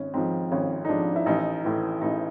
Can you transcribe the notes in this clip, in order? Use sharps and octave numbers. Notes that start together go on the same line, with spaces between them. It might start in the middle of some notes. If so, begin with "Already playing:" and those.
Already playing: G#1 C#4
G#2 F3 C4
G#1 C#4
D#4
G#2 F3 D4
E4
A1 D#4
A2 E3
A1 D#4